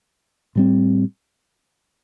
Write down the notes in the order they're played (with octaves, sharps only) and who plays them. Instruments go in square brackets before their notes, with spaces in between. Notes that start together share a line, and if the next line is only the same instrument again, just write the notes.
[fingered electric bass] A2 G3 C4